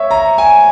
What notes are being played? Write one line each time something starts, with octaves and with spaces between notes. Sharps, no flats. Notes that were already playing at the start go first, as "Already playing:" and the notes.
Already playing: C#5 E5
A#5
G#5